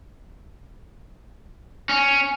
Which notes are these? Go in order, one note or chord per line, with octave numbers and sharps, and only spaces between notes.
C#4